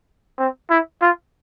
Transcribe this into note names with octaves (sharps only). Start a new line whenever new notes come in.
C4
E4
F4